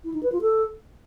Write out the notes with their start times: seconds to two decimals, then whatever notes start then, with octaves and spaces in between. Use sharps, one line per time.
0.05 E4
0.14 D#4
0.23 B4
0.32 F4
0.41 A4